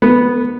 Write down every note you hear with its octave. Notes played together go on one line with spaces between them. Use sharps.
B3